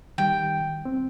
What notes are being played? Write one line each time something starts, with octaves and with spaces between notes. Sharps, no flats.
D#3 G3 G5
C4